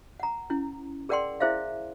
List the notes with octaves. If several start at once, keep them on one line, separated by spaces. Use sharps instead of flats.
F#5 A#5
C#4 E4
G#4 A#4 D5 F#5 G5 C6
E4 G#4 C5 E5 F5